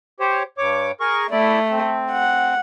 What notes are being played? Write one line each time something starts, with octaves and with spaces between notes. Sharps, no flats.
G4 C5 C#5
G2 C#5 D6
G#4 A#4 C#6
A3 E4 D5
C4
F#5